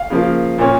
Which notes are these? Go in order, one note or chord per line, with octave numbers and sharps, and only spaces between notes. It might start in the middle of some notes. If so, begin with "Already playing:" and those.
Already playing: F5
C#3 F3 A#3
A#2 A#3 C#4